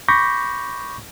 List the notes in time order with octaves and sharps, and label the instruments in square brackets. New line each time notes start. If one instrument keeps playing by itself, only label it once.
[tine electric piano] B5 C#6 D6 G6 A#6 B6